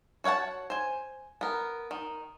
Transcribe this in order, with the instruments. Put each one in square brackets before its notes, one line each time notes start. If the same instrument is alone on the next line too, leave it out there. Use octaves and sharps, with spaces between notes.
[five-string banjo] F#4 C#5 F5 F#5 A5
C5 G#5
B3 A#4
D#3